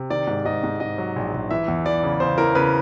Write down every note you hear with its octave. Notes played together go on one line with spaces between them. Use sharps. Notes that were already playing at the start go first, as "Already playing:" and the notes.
Already playing: C3
D#3 D5
G#2
G#2 D#5
G#2
G#2 D#5
F#3
A#1
A#1
E3 E5
E2
E3 D5
C#3
C#3 C5
E3 A#4
C#3 B4